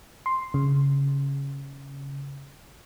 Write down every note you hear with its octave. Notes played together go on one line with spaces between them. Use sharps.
C6
C#3